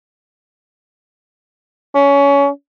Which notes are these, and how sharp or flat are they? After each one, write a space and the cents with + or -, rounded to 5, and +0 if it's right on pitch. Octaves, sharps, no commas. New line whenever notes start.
C#4 +20